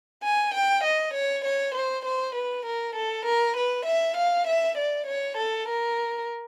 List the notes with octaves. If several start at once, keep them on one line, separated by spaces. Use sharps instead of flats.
G#5
G5
D#5
C#5
C#5
C5
C5
B4
A#4
A4
A#4
B4
E5
F5
E5
D5
C#5
A4
A#4